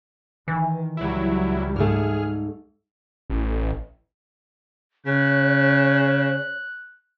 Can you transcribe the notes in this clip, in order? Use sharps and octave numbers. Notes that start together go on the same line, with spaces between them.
D#3 E3
C#2 F#3 G3 E4
G#2 A3 G#4 F6
A1
C#3 C#5 F#6